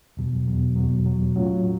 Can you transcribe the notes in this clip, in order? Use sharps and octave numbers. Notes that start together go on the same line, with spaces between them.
E2 B2 F#3
E2 B2 F#3
E2 B2 F#3
E2 B2 F#3
A2 F#3 A3 C#4 F4